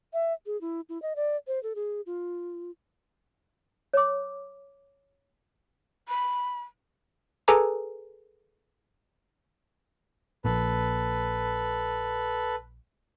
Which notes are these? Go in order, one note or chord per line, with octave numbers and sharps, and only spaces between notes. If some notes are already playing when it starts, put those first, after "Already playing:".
E5
G#4
E4
E4
D#5
D5
C5
A4
G#4
F4
C#5 D6
B5
G#4 A4 B4 G#5 A#5 D6
A#1 A#2 A4 B4